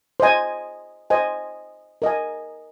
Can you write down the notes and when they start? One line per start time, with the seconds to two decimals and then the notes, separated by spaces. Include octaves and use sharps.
0.20 C5 D#5 G#5
1.10 C5 D#5 G#5
2.02 A#4 D#5 G#5